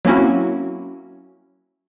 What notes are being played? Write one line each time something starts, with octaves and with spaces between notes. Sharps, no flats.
F#3 A#3 C4 C#4 E4 F#4